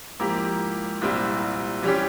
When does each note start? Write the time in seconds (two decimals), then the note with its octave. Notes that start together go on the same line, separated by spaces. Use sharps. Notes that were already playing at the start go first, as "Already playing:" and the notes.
0.20 G#2 F3 A#3 E4 G4
1.02 C2 A#2 G3 C4 E4
1.83 E3 G3 C#4 G4